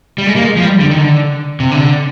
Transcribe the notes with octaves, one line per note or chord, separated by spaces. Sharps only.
G3
G#3
A#3
G#3
F3
G3
D3
D#3
D3
C3
D3